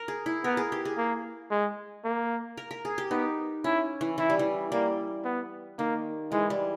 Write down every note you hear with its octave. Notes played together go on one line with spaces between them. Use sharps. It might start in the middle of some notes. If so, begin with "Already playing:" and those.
Already playing: A#4
G#4
E4
B3 A#4
G#4
G4
G#4
A#3
G#3
A#3
A#4
A#4
G#4
G4
B3 D#4
C#4 E4
E3
E3 E4
G3
E3
G3 A#3
B3
D#3 A#3
E3 G#3
G3